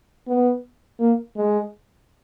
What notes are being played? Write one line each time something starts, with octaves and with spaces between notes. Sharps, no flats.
B3
A#3
G#3